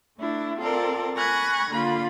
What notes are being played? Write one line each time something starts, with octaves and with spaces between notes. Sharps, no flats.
A3 D4 E4
C4 F4 A4 A#4 D5
G#5 B5 C#6 F#6 G#6 A#6
D3 A#3 F4 B5